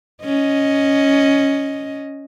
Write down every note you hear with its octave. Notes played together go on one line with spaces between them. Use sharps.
C#4 D#5